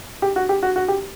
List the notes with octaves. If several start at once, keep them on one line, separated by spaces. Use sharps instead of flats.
G4
F#4
G4
F#4
F#4
G4